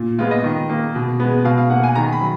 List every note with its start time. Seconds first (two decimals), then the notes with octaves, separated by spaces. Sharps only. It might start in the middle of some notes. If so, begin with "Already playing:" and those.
Already playing: A#2
0.19 G#3 B3 F4
0.31 D#5
0.44 D#3
0.69 A#3
0.95 B2
1.20 G#3 B3
1.45 B2 F5
1.58 F5
1.70 A#3 F#5
1.83 G#5
1.95 D#3 A#5
2.12 B5
2.21 F#3